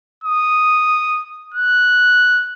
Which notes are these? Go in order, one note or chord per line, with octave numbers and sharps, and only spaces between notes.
D#6
F#6